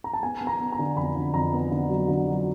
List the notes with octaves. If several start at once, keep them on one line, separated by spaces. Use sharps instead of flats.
A#5
A5
B3 G#5
B3
A#5
B3
A#5
D3
F2 B5
D3
F2 A#5
B3
D3
F#3
D3
F#3